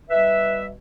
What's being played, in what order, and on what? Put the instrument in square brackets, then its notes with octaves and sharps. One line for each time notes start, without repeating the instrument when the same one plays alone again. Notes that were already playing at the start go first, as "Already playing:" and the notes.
[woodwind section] B2 G3 B4 E5